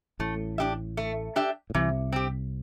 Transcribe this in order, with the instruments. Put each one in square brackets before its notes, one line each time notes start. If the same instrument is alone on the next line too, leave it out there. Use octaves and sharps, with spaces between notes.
[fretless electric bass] A1 A2 [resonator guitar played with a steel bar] A3
[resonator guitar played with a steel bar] D4 G4 E5
A3
D4 G4 E5
[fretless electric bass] A2
[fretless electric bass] C2 C3 [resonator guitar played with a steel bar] E3
[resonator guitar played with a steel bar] C4 G4